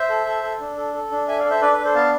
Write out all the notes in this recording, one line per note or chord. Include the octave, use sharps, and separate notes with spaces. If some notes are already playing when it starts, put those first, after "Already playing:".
Already playing: C5 E5
A4
A4
A4
D4
A4
A4
D4
A4 E5 G#5
D5 F5
A4
C5 E5
D4 B4 D5
B4
D4
A4 C5
B3 F5 A5